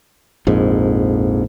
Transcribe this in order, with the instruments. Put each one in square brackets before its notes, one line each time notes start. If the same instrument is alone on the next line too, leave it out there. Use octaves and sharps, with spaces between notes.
[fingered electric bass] A#1 F2 G#2